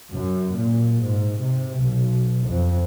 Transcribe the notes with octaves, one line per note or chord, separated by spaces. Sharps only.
F#2
A#2
G#2
C3
B1
F2